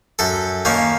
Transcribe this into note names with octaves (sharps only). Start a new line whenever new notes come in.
F#2 A4
D#3 A#3 C#4